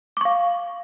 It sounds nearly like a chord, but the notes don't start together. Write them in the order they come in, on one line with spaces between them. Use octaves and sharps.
D6 C#6 F5